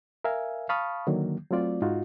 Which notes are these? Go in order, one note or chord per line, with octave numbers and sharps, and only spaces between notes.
A#4 E5 F5 G#5
F5 A5 B5 C#6 D#6 F6
D3 D#3 F#3 A#3
F#3 A3 C4 F4 D5
G#2 D#4 F4 F#4